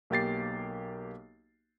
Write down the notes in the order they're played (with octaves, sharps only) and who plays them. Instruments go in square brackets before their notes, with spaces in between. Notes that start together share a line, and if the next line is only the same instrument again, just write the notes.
[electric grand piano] B1 A#3 G4 A6 C7